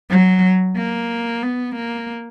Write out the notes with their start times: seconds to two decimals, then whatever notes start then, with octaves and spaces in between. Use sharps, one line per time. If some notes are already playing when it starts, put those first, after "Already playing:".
0.10 F#3
0.76 A#3
1.43 B3
1.76 A#3